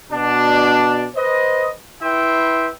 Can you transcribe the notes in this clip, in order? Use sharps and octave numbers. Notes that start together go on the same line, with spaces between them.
B2 D4
B4 C5 D#5
E4 B4 E5 G5 C6